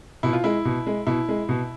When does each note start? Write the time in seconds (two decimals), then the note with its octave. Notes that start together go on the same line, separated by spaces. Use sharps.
0.23 B2 E4
0.33 F4
0.44 G#3 E4
0.65 B2
0.87 G#3
1.07 B2 E4
1.29 G#3
1.49 B2